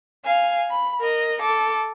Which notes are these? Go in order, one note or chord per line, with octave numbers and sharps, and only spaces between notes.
F5 G#5
B5
A#4 D#5
A4 D6